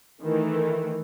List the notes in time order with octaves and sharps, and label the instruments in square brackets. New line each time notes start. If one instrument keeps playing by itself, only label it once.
[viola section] D#3 E3 A3